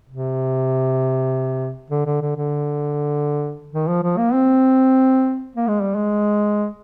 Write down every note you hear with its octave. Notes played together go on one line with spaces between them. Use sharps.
C3
D3
D3
D3
D3
D#3
F3
F3
A#3
C4
A#3
G#3
G3
G#3